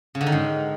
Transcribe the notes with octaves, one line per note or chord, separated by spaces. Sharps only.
C#3
D3
D#3
G#2